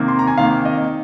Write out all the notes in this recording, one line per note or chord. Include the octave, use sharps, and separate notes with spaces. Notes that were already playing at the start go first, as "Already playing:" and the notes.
Already playing: C3 D#3 A#3
C6
A#5
G#5
C3 D#3 A#3 F5
D#5